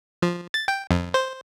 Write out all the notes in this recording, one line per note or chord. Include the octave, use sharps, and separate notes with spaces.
F3
A6
G5
F2
C5